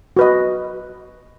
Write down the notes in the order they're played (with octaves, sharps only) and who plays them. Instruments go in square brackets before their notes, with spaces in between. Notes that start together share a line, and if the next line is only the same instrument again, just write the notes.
[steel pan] F#4 B4 D#5